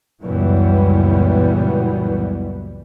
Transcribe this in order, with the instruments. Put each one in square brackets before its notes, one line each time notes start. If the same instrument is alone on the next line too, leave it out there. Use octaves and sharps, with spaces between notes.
[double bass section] C#2 F#2 A#2 E3 G3 B3